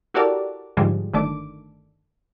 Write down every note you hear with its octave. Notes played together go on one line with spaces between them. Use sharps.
E4 F#4 G4 A4 A#4 D5
G#2 D3 F3 G3 G#3
G1 D#3 A3 D4 D6